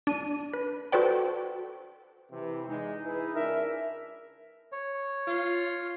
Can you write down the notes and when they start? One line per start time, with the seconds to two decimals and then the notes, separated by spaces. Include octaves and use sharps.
0.07 D4 D#7
0.53 B4
0.92 F#4 A4 B4 C5 D5 G5
2.31 C3 E3
2.67 E2 G#3 D#4
3.04 E4 G#4 B4
3.36 C#2 D4 A#4 E5
4.72 C#5
5.27 F4